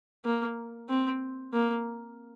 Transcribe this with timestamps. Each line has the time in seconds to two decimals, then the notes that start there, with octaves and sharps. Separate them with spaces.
0.25 A#3
0.89 C4
1.53 A#3